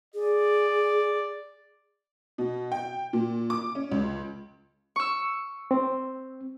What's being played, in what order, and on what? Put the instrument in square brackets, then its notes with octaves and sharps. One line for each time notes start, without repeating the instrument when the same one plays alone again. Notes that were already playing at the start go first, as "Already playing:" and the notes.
[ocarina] G#4 [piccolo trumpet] D5
[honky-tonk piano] B2
G5
A#2
D6
C#4
C#2
[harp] C#6 E6
[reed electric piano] C4